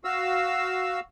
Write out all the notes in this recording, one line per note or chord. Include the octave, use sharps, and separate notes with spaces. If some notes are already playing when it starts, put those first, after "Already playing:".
F#4 F5 E6